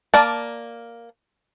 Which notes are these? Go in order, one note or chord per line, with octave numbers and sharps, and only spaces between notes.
A#3 D5 A5